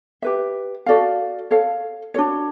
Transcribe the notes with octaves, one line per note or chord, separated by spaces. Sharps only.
G4 B4 E5
F#4 A4 D5 F5
A4 C#5 F5
D4 F#4 A4 C#5